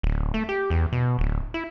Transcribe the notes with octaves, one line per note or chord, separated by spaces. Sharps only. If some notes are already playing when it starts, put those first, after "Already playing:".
D1
A3
G4
E2
B2
D1
E4